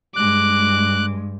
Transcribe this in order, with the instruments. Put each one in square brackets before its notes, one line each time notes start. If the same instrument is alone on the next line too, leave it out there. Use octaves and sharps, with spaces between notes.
[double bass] G2 [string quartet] G#3 [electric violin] D6 [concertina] F#6